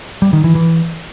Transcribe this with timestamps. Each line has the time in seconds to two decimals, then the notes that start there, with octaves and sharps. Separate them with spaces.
0.22 G3
0.33 D#3
0.44 E3
0.55 E3